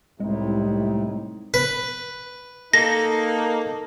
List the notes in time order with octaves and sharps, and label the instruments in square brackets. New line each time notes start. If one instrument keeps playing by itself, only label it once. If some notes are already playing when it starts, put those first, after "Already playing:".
[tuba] C2 [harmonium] A2 [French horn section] C3 D#4 E4 [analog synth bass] G#3
[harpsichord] B4
[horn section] A#3 D#4 [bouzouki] A4 [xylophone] A#6